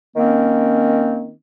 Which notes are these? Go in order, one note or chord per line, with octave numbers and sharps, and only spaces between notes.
D#3 A#3 C4 C#4